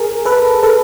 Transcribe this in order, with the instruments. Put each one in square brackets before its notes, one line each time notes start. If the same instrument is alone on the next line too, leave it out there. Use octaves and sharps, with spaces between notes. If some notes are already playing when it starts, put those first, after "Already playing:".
Already playing: [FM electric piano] G#4 A#4
A4 B4
A4 B4